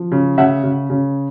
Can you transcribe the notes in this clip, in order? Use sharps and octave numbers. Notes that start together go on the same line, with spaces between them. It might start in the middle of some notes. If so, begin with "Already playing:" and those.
Already playing: F3
C#3
C#3 E5 F#5
C#3
C#3